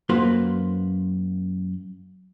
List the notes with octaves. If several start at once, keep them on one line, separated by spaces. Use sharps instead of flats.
F#2 A#3 F#4 B4 C5 C6